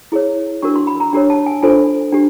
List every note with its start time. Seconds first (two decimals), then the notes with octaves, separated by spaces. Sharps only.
0.12 E4 G#4 C#5
0.62 D4 F#4 A#4 C#6
0.76 C6
0.87 B5
1.00 A#5
1.13 D4 G4 A#4 C#5
1.30 A5
1.46 G#5
1.62 D4 F4 A4 C5 G#5
2.12 D4 G4